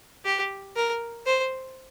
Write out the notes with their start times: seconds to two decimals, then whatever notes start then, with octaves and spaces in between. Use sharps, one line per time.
0.25 G4
0.76 A#4
1.26 C5